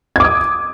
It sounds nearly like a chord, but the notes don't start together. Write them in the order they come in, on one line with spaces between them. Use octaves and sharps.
G#6 D6 D#6